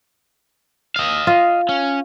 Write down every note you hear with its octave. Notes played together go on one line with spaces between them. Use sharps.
D#5 F5
F4
C#4